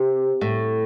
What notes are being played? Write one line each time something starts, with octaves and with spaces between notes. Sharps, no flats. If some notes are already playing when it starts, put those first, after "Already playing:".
Already playing: C3
A2